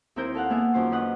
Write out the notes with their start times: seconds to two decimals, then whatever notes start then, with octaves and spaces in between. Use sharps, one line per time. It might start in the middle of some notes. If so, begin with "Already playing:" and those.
0.16 D#2 C4 E4 A#4 G6
0.35 A4 F5 F#5
0.50 A#3 B3 G#4 E5
0.74 F#2 D#3 C#4 F4 C5
0.91 C#4 D4 B4 D#5 F#5